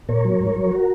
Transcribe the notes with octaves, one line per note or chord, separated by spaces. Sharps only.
A#2 A#4 C#5
F#3
G#2
F#3
F#4 A#4